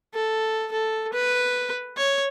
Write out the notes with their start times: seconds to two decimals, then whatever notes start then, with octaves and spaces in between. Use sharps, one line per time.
0.14 A4
0.72 A4
1.13 B4
1.98 C#5